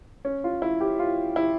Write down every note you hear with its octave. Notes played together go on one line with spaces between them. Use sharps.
C#4
F4
E4
G4
F4
E4